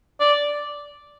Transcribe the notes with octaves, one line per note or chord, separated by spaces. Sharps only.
D5